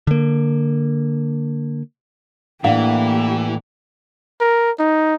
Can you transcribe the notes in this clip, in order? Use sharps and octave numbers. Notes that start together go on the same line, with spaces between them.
D3 A#3
A2 E3 A#3 D4 G4 F5 F#5
A#4
D#4